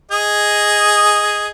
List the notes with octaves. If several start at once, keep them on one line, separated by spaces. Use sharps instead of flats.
G#4 D#5